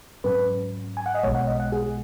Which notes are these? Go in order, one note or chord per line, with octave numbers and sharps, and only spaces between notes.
G#2 F#3 C#4 B4
G#5
F#5
D#5
B1 B2 G#3 C#5
F#5
D#5
F#5
G#4